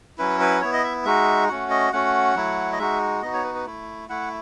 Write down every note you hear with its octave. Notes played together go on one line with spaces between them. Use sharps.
F#3 C#4 E4 B4
B4
B3 E4 C#5
D#5
E5
G#3 D#4 F#4 E5
A3 C#4 F#4 F#5
D#5
A3 C#4 F#4 F#5
F#3 A3 E4
D#5
G#3 D#4 F#4 E5
B3 D#4 F#4 D#5
C#5
B4
B4
A3 E4
A3 E4 F#5